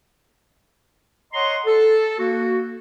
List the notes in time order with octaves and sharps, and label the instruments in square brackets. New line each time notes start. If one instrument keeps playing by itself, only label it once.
[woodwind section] C#5 D#5 F#5 A#5 C6
A4
A#3 F#4